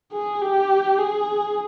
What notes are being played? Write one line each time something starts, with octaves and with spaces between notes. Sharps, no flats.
G#4
G4
G#4